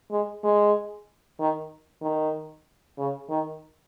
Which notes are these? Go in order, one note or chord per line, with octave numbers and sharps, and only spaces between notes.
G#3
G#3
D#3
D#3
C#3
D#3